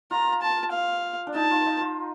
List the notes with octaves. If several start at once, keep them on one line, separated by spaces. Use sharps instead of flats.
F4 A#5
A5
F5
D4
D#4 A5
F4
D#4
F4